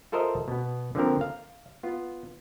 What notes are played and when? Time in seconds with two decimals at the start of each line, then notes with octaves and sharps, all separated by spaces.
0.12 F4 A4 A#4 C5 D#5 E5
0.48 B2 B3
0.95 D3 F3 A#3 C4 A#4
1.21 F5
1.83 B3 F4